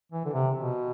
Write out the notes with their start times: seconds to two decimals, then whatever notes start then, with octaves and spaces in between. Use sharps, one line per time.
0.12 E3
0.25 D3
0.33 C3
0.55 B2